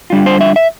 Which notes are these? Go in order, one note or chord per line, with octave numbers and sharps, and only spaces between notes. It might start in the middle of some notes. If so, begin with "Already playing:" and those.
D3 G3 D4 F4
C5
E5
E5